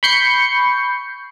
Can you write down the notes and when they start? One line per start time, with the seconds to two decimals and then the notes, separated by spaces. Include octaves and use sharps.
0.03 B5 C#6 G6 C7 C#7